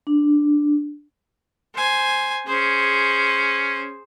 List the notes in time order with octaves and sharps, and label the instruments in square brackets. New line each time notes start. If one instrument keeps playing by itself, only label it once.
[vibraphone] D4
[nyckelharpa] C5 G#5
[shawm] C#4 [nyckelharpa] G#4 C5